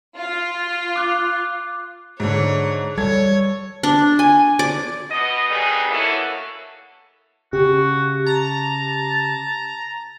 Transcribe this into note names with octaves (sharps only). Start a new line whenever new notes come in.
F4
D6 F#6
G#2 D3 C#5
G3 A4 C#5 G#6
D4
G#5
D5
B2 D#5
D3 D#3 G3 B3 D#4 G#4
A#3 B3 C#4 E4 F#4 A4
C#3 F#4 G4
A5 A#5